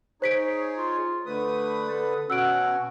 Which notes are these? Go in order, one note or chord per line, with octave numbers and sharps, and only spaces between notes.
D#4 G#4 C5 C#5 B6 D7
F4
D3 A3 B4 D#6
A4
B2 C#4 F#4 F#5 E6 D7